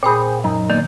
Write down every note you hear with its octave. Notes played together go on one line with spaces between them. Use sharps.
A#2 C4 G#4 C5 B5
F#2 D#4
D#3 A#3 B3 D5